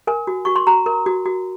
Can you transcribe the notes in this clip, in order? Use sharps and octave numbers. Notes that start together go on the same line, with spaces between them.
A#4 G#5
F#4
F#4 C#6
C6
F#4 A#5
A#4
F#4
F#4